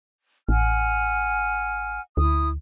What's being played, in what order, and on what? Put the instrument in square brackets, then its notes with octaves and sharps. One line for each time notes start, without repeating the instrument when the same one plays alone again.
[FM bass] A1 [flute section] F#5 G#5 F6
[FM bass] D2 [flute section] E4 D#6